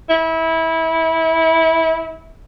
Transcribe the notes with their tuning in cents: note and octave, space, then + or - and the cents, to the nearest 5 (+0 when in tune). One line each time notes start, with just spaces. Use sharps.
E4 -20